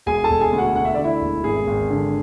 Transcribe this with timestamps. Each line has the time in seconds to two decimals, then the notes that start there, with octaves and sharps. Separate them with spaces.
0.06 E1 G#4 G#5
0.24 A4 A5
0.30 E1
0.41 G#4 G#5
0.53 D2
0.58 F#4 F#5
0.75 D3 F#5
0.85 E5
0.94 D2 D5
1.04 E4 E5
1.21 E1
1.44 G#1 G#4
1.67 G#1
1.90 D3